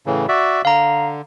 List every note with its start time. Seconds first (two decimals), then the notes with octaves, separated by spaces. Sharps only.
0.06 A2 C#3 E3
0.29 F#4 D5 E5
0.65 D3 F5 A#5